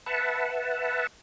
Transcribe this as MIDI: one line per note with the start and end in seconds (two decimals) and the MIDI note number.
0.06 1.07 71
0.06 1.07 76
0.06 1.07 78
0.06 1.07 81